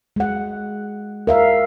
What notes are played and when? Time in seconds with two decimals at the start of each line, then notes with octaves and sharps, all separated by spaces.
0.16 G#3 F#5
1.27 A#4 E5 F5